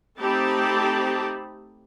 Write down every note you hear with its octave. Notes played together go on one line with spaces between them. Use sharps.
A3 C4 D#4 G4 A5 B5